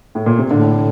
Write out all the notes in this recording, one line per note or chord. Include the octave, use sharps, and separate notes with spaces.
A2
A#2
C3
A2 D3